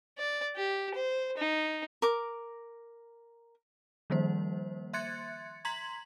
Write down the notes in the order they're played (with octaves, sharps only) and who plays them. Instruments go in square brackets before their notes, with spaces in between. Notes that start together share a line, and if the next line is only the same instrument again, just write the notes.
[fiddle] D5
G4
C5
D#4
[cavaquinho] A#4 D6
[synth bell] D#3 F3 G3 A#3 C5
E5 C6 F#6 G#6 A6 C#7
A#5 C6 G#6 B6 F#7